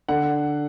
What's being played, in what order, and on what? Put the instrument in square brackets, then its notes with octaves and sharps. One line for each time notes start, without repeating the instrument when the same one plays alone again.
[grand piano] D3 F#5